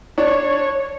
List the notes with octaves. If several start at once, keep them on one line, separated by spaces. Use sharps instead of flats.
D4 C#5